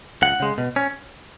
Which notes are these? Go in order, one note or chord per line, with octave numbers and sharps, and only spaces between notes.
C#2 F#5
C#3 G#3
B2
C#4